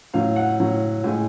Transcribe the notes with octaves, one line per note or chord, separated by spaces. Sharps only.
A2 F#3 F5
F#5
A2 F#3
A2 G#3